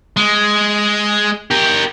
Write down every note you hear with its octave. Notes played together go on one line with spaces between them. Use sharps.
G#3
G4 A#4